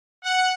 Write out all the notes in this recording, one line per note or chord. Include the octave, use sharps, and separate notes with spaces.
F#5